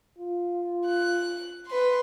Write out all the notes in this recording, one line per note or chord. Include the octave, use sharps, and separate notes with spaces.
F4
F#6
B4 C6